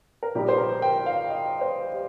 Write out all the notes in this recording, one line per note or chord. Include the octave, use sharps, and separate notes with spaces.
A#4
A#1 A#2 G3 A#3 D#4 G4
C5
A#4
G5
F5
D#5
C5
G4